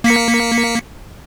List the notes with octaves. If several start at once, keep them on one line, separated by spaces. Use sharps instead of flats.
A#3 B6 C#7